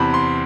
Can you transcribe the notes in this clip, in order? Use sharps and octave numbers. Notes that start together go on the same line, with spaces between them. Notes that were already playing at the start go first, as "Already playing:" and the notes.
Already playing: E2 C3 E3 A5 B5
C6